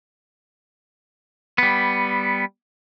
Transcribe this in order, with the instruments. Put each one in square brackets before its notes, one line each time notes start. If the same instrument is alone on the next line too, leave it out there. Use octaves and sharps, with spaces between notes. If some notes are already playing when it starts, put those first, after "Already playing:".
[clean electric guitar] G3 B3